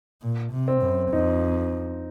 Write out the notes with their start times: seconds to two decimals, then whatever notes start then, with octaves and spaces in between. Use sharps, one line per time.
0.22 A#2
0.52 C3
0.68 C4
0.82 F#2
1.12 F2 D#4